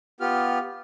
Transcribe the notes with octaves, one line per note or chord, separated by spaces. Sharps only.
B3 F4 G4 F6